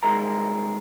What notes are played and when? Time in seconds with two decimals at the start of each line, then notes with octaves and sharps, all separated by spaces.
0.03 C2 D#3 G#3 A#4 A#5